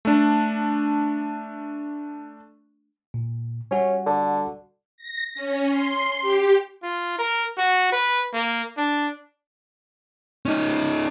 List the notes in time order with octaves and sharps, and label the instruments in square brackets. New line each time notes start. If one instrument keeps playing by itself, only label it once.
[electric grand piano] A3 D4
[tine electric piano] A#2
[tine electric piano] G3 F#4 [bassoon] C#4
[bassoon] D3
[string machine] A#6
C#4
C6
G4
[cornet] F4
A#4
F#4
B4
A#3
D4
[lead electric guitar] C#4 D#4